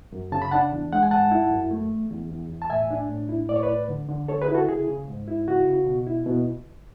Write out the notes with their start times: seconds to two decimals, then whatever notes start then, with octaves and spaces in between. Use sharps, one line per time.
0.12 F#2
0.32 C#3 A5
0.42 B5
0.51 D4 F#5 A5
0.72 E2
0.92 G#3 F#5
1.03 G#5
1.11 G#2 F#5 A5
1.31 E4
1.51 F#2
1.71 A3
1.92 E2
2.11 E2
2.31 E2
2.50 E2
2.62 A5
2.70 A2 E5 G#5
2.90 D4
3.09 A2
3.29 E4
3.49 A2 D5
3.56 C#5
3.63 B4 D5
3.68 A2
3.89 D3
4.08 D3
4.28 D3 A4 C#5
4.42 G#4 B4
4.48 E4
4.54 F#4 A4
4.67 C#3 G#4
4.88 C#3
5.08 G#2
5.28 E4
5.47 C#3 F#4
5.67 C#3
5.86 B2
6.07 E4
6.26 B2